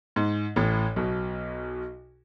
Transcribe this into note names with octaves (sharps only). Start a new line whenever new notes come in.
G#2
A1 A2
B1 B2